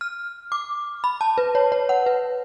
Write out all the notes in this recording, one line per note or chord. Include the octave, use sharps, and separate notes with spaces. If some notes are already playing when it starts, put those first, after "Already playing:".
F6
D6
B5
A5
B4
C#5
C#5
F#5
B4